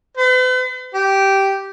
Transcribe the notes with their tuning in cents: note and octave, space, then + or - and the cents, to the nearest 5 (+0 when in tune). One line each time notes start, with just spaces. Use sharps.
B4 +45
G4 -10